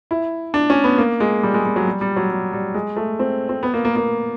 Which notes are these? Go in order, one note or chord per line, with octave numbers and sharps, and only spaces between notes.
E4
D4
C#4
B3
A#3
G#3
G3
G#3
G3
F#3
G3
G3
F#3
G3
G3
G#3
A3
C4
C4
B3
A#3
A#3
A#3